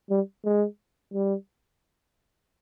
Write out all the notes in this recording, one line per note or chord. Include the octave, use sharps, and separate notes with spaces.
G3
G#3
G3